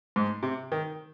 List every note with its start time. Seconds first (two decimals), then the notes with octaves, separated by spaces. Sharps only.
0.16 G#2
0.43 C3
0.72 D#3